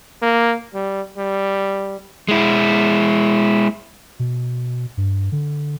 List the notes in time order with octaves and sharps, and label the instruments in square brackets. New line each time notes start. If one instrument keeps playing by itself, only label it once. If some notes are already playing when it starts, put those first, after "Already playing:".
[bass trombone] A#3
G3
G3
[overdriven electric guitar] G#3 E4
[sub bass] B2
G2
D3